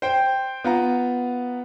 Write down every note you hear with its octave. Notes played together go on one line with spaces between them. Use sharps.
C5 G5
B3 F4 A#5